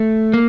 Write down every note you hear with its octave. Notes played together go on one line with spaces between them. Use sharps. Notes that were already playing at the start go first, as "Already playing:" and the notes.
Already playing: A3
A#3